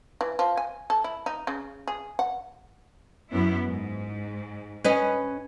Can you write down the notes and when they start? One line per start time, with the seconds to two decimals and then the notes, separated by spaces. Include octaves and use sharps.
0.21 E3
0.39 F3
0.57 G#5
0.90 A4
1.04 E4
1.26 D#4
1.47 C#3
1.87 G#4
2.19 F#5
3.31 F#2 B3 E4
3.66 G#2
4.84 C#4 B4 D#5